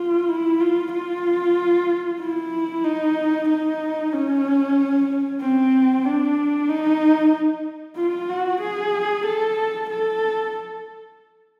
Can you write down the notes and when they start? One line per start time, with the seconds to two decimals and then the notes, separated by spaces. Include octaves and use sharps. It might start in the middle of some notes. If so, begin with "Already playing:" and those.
Already playing: F4
0.28 E4
0.61 F4
0.92 F4
2.20 E4
2.85 D#4
3.49 D#4
4.12 C#4
5.41 C4
6.05 D4
6.69 D#4
7.97 F4
8.29 F#4
8.61 G#4
9.26 A4
9.90 A4